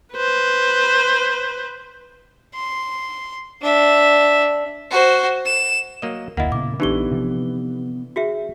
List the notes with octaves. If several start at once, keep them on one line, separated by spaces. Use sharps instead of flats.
B4 C5
C6
D4 E5
F#4 C5
E7
F#3 A#3 D#5
F1 D2 A#3 E4 D#5 F#5
A#2 C#3 B3 D6
A#1 D3 E3 B3 D4 D#4 G4 G7
C3 F3
F#4 G#4 E5